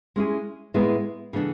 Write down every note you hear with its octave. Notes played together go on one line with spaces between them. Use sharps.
G#3 C#4 E4 G#4
A2 G#3 B3 E4
C#3 E3 B3 D4 A4